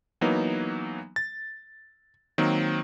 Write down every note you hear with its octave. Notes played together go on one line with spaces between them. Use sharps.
E3 F#3 A#3 B3 D#4
A6
D#3 F#3 A#3 C4